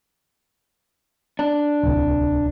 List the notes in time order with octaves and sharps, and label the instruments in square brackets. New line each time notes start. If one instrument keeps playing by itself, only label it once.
[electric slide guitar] D4
[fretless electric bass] D1 C2